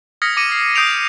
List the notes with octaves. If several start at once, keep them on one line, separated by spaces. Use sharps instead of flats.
D#6 F6 G#6 A#6 B6 C#7
D6 A#6 C#7 D#7
C7
D#6 G6 C7 D7 F7